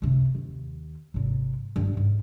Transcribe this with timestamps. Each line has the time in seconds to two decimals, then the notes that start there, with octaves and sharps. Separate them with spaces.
0.02 F1 C3
0.35 D#2
1.14 G#1 C3
1.76 G2 D4
1.97 G#2